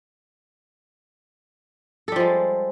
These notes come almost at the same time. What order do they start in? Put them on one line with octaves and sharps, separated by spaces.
A4 G3 F3 G#3